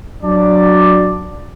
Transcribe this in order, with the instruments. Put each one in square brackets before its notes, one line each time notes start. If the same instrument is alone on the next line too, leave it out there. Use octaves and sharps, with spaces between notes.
[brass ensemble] F#3 D4 D5